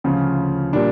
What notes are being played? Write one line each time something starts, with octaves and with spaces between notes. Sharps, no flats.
D2 C#3 F3 C#4 F4
A#2 G3 D4